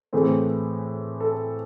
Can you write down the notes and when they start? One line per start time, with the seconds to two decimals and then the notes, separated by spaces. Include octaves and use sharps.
0.13 A2 E3 A3 C4 G#4
1.20 A4